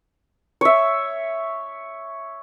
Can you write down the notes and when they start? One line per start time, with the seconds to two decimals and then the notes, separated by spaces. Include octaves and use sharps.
0.61 C#5 E5